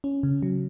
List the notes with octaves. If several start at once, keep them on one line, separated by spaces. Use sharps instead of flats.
C#4
C#3
F#3